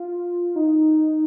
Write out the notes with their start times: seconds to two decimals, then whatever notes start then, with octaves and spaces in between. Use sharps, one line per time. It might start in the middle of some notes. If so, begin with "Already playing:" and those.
Already playing: F4
0.56 D#4